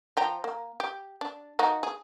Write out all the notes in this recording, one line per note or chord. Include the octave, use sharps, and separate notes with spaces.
F3 G5 A#5
A#3
G4
D4
A#3 D#4 F#4
G#4